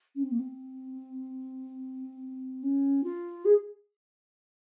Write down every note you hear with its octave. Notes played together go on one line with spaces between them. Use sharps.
C#4
C4
A#3
C4
C#4
F4
G#4